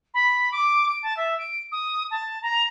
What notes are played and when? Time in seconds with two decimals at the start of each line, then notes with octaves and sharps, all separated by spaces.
0.14 B5
0.52 D6
0.88 D7
1.02 A5
1.17 E5
1.38 D7
1.71 D#6
2.11 A5
2.42 A#5